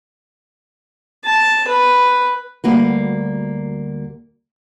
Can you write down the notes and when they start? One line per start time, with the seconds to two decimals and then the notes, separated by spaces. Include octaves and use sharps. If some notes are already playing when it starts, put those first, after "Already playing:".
1.26 A5
1.68 B4
2.64 D2 G3 A#3 F#4 B4